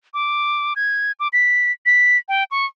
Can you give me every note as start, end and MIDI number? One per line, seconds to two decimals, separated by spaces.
0.14 0.74 86
0.76 1.12 92
1.20 1.28 86
1.33 1.72 95
1.86 2.18 95
2.29 2.44 79
2.51 2.66 85